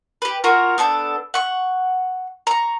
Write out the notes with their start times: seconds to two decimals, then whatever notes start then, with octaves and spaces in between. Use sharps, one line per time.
0.22 G4 B4
0.44 F4 F#4 A#4 C#5
0.78 B3 D4 A4 G6
1.34 F#5 C#6
2.47 A#5 C#6